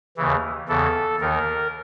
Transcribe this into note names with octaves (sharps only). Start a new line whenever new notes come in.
D#2 C#3 E3
E2 C#3 E3 A4
D#2 D#3 A#4